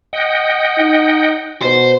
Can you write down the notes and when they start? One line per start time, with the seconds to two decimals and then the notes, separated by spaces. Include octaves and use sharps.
0.13 D#5 F#5 G5
0.78 D#4
1.62 B2 C5